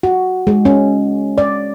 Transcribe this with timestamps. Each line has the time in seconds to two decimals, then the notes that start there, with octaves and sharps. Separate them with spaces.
0.03 F#4
0.47 G#3
0.65 C#4
1.38 D5